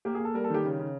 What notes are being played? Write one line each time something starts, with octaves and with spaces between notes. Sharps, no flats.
A#3 G4
G#4
A#3 A4
G3 A#4
A4
D#3 G4
C#3
C#3